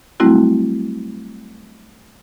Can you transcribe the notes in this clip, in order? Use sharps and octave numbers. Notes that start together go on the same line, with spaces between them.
F#3 G3 A3 C4 E4 F#4